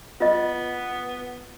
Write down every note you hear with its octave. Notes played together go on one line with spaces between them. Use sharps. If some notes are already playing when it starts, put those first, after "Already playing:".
B3 F4 D#5